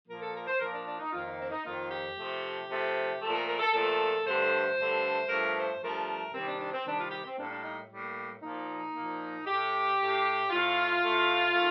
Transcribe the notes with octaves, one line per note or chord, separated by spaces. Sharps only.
A#2 F3 A#3 A#4
A4
A#4
C5
A#2 F3 A#3 A#4
D4
D4
D#4
F2 D#3 A#3 F4
D#4
C4
D#4
F2 D#3 A#3 F4
G4
C3 F3 A3
C3 F3 A3
A#2 F3 A3 A4
A#4
A#4
A4
A#2 F3 A3 A4
G2 D3 A3 C5
G2 D3 A3
G2 F3 A3 A#4
C5
G2 F3 A3 A#4
C3 D#3 G3 C4
D4
D4
C4
C3 D#3 G3 D4
F4
G4
C4
A2 G3 A#3 D4
D4
D#4
A2 G3 A#3
A#2 F3 A#3 D#4
A#2 F3 A#3
A2 A3 G4
A2 A3
A2 A3 F4
A2 A3
D#3 A3